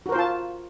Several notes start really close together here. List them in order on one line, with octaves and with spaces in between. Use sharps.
F#4 A#4 C5 F4 A5